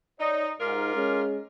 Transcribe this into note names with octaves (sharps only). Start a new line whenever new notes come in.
D#4 C#5 D5
G#2 F4 G4 A#4
G#3 C#4 G#4